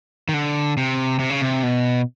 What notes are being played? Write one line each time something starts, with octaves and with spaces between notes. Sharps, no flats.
D#3
D3
C3
C3
C#3
C3
B2